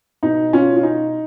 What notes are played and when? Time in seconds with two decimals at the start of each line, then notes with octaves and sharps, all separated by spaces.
0.23 B2 D#4
0.53 C#4 F4
0.76 F4
0.83 D#4